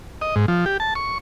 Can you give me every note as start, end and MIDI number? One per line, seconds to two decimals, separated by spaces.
0.21 0.35 75
0.36 0.46 44
0.48 0.65 53
0.66 0.77 67
0.80 0.94 81
0.95 1.18 85